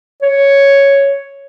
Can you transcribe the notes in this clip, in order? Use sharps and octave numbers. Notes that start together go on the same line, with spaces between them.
C#5